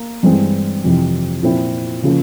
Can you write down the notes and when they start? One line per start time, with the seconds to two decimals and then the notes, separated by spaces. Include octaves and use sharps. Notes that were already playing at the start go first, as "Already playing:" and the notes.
Already playing: A#3
0.23 G2 E3 G#3 C4
0.84 F2 C3 E3
1.43 A#2 F3 C4 E4
2.03 C#3 F3 A#3 C#4